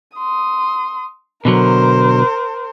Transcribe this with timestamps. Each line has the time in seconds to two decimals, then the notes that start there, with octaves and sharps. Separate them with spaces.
0.17 C6 D#6
1.45 B2 D3 F#3 A#4 C5